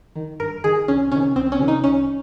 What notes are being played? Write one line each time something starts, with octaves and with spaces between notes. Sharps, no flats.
D#3
G2 A#4
D#3 G#4
C2 C#4
C3 D#3 C#4
C2 C4
C#4
C3 D#3
D#4
C2 C#4